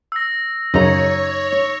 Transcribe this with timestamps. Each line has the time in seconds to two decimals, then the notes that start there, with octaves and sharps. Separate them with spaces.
0.12 E6 A#6
0.74 F#2 C#3 D#4 C#5 D#5 A#5